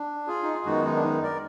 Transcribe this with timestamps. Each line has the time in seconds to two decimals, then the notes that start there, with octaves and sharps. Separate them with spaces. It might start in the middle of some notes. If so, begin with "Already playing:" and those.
Already playing: D4
0.27 F4 G#4
0.43 D#4
0.54 F4
0.65 F#2 D#3 G#3 B3 D#4 F#4
0.85 D#4
0.96 D4
1.03 D#4
1.22 A#4 D5